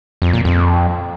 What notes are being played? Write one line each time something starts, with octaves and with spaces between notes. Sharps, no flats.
F2
A#2
F2